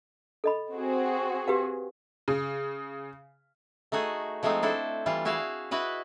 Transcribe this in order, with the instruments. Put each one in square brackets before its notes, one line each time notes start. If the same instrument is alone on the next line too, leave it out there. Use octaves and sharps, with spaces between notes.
[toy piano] A4 D#5 B5
[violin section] C4 F#4 G#4
[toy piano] G4 B4 F5
[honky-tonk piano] C#3
[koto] A3 D#4 F#4 G#4
F3 G#3 A3 C4 D#4
D4 E4 A4 C5
E3 G3 F4
E4 F#4 G#4 E5 F5
E4 F#4 B4 D#5